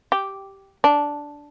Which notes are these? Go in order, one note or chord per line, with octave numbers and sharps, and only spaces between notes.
G4
D4